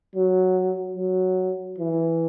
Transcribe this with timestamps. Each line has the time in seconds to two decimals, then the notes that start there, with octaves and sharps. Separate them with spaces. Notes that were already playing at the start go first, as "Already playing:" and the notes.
0.16 F#3
0.97 F#3
1.78 E3